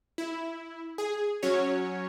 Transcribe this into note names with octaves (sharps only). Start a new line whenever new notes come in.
E4
G#4
F#3 C#4 C#5